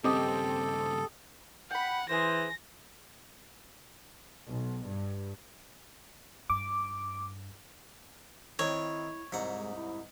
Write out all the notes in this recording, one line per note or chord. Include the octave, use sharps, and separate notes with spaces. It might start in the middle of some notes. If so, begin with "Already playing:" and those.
G2 C#3 C4 G4 A4 D#5
F#5 G5 B5
E3 G#4 A#4 C5 A#6
B1
G2
G2 D6
D#3 C4 E4 C#5
C2 G#2 F#5
G#3
E4